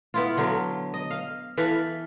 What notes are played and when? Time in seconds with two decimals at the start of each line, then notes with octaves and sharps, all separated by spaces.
0.14 B3 E4 F4
0.37 D3 F#3 B3 F5
0.94 D#5
1.11 F5
1.57 E3 A4 B4 F5